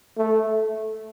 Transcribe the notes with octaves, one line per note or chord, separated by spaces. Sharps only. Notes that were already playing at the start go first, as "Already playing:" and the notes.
A3